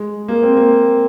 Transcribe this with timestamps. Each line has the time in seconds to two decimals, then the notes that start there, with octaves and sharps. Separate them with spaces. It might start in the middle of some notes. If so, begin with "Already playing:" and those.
Already playing: G#3
0.28 A#3
0.43 C4
0.57 A#3